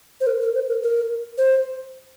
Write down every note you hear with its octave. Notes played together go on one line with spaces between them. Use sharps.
C5
A#4
A#4
C5
A#4
A#4
C5